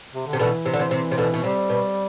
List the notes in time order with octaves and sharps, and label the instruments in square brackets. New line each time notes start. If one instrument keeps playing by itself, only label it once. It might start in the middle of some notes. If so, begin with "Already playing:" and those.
[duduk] C3
D3
[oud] C3
[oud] B2 D3 [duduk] E3
[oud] C3
D3
C3
C3
C3
B2 D3
B2
[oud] C3 [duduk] G3
[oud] B2